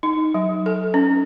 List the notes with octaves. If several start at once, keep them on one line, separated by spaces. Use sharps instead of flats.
D#4
F#3
A4
C#4